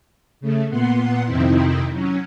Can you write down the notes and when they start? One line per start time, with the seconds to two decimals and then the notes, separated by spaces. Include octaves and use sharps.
0.41 C#3 A3
0.69 A#2 B3 F#5 C6
1.25 F2 C3 D#3 C4 D#4 E4
1.90 F#3 C#4